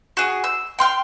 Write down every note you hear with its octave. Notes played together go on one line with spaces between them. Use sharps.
F#4 G#4
E6
G5 C6 F6